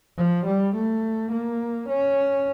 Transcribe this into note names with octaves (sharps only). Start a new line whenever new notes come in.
F3
G3
A3
A#3
C#4